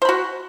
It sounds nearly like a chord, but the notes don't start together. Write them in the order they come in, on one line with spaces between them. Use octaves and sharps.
C5 B5 F#4